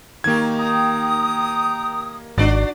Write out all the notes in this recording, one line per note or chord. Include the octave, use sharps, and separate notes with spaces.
D#3 A#3 G4 G#6
G5 A#5 D#6
G#1 D4 F#4 D5